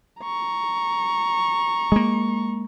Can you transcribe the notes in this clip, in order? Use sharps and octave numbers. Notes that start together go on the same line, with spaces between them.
A#5 C#6
G#3 A#3